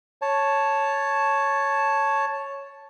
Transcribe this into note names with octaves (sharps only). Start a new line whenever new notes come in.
C#5 A5